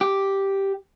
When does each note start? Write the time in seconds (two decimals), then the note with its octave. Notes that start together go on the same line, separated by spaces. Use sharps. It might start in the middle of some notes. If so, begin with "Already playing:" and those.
0.01 G4